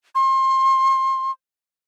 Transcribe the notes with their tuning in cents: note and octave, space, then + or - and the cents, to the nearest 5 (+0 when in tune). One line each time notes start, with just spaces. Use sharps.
C6 +30